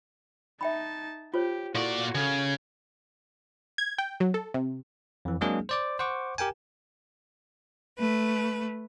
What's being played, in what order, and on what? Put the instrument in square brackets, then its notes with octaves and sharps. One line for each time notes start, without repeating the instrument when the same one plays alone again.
[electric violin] D#4 A5 [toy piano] E5 G5 B5
[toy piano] F4 C5 C#5 [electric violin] G4
[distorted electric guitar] A#2 D5 [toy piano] E4 A4 C#6 [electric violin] F#4
[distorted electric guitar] C#3 [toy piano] A4 [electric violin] G#6
[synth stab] G#6
G5
F#3
A4
C3
[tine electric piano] F2 E3
F#3 G#3 A#3 C4 D4 G#4
C5 D5 D6
C5 F#5 C#6 D6
G4 A#4 G5 G#5
[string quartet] A3 B4